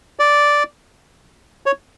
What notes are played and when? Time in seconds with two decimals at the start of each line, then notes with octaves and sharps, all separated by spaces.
0.19 D5
1.66 C#5